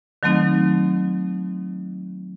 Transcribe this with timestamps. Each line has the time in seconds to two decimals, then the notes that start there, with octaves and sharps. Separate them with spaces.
0.23 D#3 F#3 A3 C4 D#4